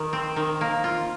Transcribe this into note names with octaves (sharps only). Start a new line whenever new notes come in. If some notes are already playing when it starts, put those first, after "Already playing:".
Already playing: D#3
C4
D#3
A#3
F4